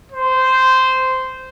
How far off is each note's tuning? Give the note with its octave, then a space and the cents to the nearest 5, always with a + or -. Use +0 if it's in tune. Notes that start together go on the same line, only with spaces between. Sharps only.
C5 -10